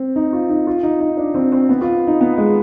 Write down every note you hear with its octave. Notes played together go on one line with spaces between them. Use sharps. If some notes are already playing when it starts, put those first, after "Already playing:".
Already playing: C4
D#4
F4
D#4
F4
D#4
D#4
D4
C4
C4
B3
F4
D#4
B3
G#3